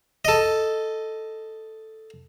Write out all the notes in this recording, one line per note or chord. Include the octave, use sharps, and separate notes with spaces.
A4 D#5